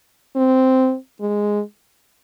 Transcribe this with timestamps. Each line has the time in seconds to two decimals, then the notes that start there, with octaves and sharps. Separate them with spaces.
0.36 C4
1.21 G#3